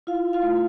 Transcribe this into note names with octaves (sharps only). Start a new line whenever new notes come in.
E4 F4 F5
E4
F4 F5
A3